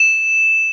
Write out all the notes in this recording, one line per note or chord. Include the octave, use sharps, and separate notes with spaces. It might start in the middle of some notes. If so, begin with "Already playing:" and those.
Already playing: E7